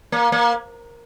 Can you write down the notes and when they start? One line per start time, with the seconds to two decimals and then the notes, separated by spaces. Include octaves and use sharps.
0.12 A#3
0.32 A#3